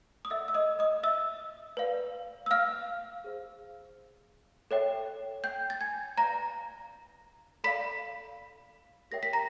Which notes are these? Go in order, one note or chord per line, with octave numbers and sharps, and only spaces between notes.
D#6
A4 D5 E5 F#5 E6
E6
D#5 D#6
D#5 D#6
E5 E6
B4 D5 F5
E6
F5 F6
G#4 C5 F5
A4 C#5 E5 G5
G5 G6
A6
G#5 G#6
B4 D5 F5 A#5 A#6
A4 D5 F5 B5 B6
G4 A#4 C#5 E5 G5 A#6
B6
A#5 A#6